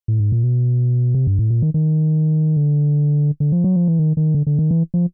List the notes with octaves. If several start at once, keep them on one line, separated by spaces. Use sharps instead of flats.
A2
G#2
A#2
B2
C3
G2
A2
A#2
D#3
D#3
D3
D3
F3
F#3
F3
E3
D#3
D#3
D3
D3
D#3
E3
F3